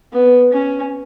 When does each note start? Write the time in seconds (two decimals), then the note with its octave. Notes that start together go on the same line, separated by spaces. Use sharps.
0.12 B3
0.52 C#4